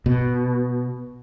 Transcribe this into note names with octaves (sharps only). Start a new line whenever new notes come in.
B2